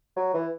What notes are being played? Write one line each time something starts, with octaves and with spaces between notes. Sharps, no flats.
F#3
E3